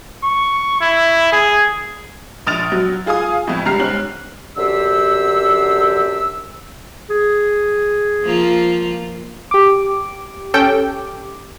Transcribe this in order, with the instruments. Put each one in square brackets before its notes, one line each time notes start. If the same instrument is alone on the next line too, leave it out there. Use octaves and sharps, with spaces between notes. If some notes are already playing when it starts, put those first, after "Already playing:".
[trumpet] C#6
E4
G#4
[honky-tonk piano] A#1 D#6 F6 A6 F7
F#3
F4 G#4 F5 G#5 D#6
F2 A2
C#2 G3 A#5 F6 C7
G#2 C#4 F#7
[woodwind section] F#2 D3 G4 C5 E6
[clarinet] G#4
[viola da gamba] F3 A#3 F4
[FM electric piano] G4 D6
[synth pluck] C#4 A4 G5